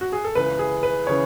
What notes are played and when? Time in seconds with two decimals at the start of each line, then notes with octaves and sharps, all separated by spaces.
0.01 F#4
0.12 G#4
0.24 A4
0.35 C#2 C#3 E3 B4
0.59 G#4
0.83 B4
1.07 C#3 E3 C#5